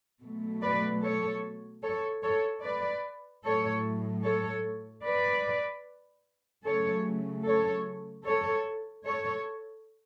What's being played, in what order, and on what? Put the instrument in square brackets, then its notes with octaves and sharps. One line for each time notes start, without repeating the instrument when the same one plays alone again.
[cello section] B2 F#3 A3
B4 D5
A4 C#5
A4 C#5
A4 C#5
B4 D5
A2 F#3 A3 A4 C#5
A4 C#5
B4 D5
C#3 F#3 A3 A4 C#5
A4 C#5
A4 C#5
A4 C#5